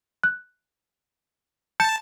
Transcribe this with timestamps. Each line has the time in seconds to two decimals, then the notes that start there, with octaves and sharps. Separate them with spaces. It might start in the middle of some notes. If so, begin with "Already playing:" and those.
0.24 F#6
1.80 A5 G6 C#7